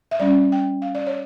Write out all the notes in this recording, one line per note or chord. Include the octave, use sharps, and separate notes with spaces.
E5
G3 C#4 D5
G5
F5
D5
C#5